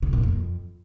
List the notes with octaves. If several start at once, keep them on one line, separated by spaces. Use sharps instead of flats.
C#3
A#2
F2